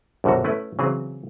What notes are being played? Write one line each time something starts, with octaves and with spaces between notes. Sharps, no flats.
A#1 F#2 B2 D3 F#4
A3 C#4 E4 B4
C#3 E3 F#3 C4 G#4